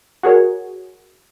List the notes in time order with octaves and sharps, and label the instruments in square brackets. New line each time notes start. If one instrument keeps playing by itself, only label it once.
[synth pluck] F#4 G#4 A#4 C#5